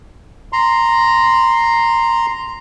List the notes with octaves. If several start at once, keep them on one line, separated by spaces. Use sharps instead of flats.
A#5 C6